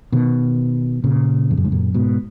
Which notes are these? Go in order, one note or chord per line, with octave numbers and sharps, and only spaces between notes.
B2 D#3
A#2 C#3
F2
F#2
G#2
F#2 A#2
G#2 B2